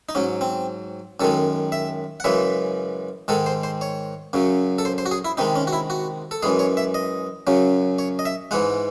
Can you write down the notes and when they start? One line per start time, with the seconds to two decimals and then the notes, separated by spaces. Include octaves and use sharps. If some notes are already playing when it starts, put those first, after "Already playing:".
0.09 D#4
0.15 G#2 F#3 C#4
0.41 C4
1.20 F#2 D#3 G#3 A4
1.72 E5
2.20 F#5
2.24 F#2 C#3 E3 G#3 E5
3.28 G#2 D#3 G#3 A4
3.46 C5
3.63 C5
3.81 C#5
4.33 F#2 C#3 F#3
4.78 A4
4.85 C5
4.98 C5
5.06 F#4
5.11 G#4
5.25 E4
5.37 C3 D#3 G#3 D#4
5.56 C#4
5.67 F#4
5.73 E4
5.90 F#4
6.31 A4
6.43 F#2 E3 G#3 G#4
6.59 C#5
6.77 E5
6.94 D#5
7.47 F#2 C#3 F#3
7.99 C#5
8.19 D#5
8.26 E5
8.51 G#2 E3 G#3 F#5